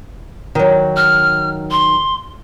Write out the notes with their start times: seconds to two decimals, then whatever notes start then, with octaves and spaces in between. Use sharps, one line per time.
0.55 D#3 F#3
0.97 F6
1.71 C6